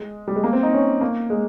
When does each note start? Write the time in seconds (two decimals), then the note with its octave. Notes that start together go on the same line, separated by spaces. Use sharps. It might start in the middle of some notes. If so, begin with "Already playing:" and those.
Already playing: G#3
0.28 G3
0.36 G#3
0.44 A#3
0.53 C4
0.63 D#4
0.73 C#4
1.01 A#3
1.30 G#3